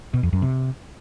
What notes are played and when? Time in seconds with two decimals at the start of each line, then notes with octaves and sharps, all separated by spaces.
0.14 B2
0.23 F2
0.33 F#2
0.42 C3